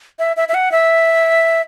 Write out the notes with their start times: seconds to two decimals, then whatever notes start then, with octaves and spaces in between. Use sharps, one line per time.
0.19 E5
0.37 E5
0.48 E5
0.54 F#5
0.72 E5